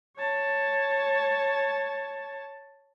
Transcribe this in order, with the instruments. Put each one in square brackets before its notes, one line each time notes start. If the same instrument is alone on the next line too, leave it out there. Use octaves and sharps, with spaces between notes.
[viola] C#5 A5